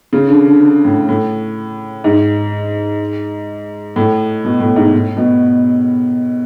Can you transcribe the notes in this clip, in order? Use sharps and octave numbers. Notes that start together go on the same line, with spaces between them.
C#3
D3
D3
D3
A2
A2
G#2
A2
B2
A2
G#2
A2
B2